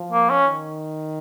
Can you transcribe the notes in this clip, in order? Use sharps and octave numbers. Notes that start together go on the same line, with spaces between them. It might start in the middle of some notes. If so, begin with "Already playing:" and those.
Already playing: F3
A#3
C#4
D#3